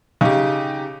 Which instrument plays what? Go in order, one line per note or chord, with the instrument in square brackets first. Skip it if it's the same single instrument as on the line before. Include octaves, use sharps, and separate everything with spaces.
[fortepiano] C#3 [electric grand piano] D#4 G4